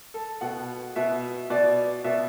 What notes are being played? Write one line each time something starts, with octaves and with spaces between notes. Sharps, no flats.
A4
B2 F#5
B2 E5
B2 D5
B2 E5